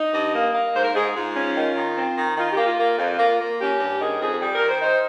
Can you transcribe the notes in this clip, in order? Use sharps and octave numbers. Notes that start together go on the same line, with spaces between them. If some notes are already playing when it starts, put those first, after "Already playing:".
Already playing: D#4 D#5
G2
A#3
A#3
G#2 C5
A#4
G#2 G#4
G#2 F4
C#4
D#3
D#3
C4
D#3
D#3 F4
G4
A#3
F4
A#3
F2
A#3
A#3
C#4 G4
G2
D#3 G#4
F2 G#4
G3 G#4
A#4
D#3
C5
D#4 C5